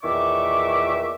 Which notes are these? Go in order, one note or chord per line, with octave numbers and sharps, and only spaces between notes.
E2 A#2 D#3 E5 C#6 D6